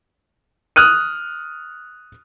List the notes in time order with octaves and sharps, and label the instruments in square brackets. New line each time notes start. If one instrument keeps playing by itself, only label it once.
[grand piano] D#6 F6 F#6 D#7